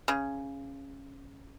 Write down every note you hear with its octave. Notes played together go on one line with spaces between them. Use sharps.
C#3